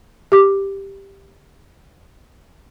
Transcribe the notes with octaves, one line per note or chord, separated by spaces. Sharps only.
G4 D6